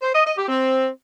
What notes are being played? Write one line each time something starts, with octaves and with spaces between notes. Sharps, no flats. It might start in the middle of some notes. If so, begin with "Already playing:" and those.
C5
D#5
D#5
G4
C4